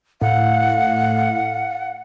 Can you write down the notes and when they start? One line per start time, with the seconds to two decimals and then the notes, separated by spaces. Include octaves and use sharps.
0.21 A2 F5 F#5